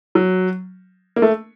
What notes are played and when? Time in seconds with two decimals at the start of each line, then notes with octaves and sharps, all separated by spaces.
0.15 F#3
1.16 A#3
1.22 A3